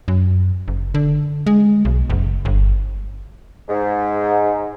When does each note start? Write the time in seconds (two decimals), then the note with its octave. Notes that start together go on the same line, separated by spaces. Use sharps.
0.08 F#2
0.68 F#1
0.94 D3
1.46 G#3
1.85 B1
2.10 F#1
2.45 G1
3.69 G#2